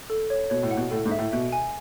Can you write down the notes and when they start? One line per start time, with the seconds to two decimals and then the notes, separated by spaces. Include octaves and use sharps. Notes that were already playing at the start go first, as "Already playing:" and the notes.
0.10 A4
0.30 C#5
0.50 B2 C#5
0.63 A2
0.71 F#5
0.77 B2
0.91 A2 A4
1.06 G#2
1.11 E5
1.19 A2
1.32 B2 E5
1.52 G#5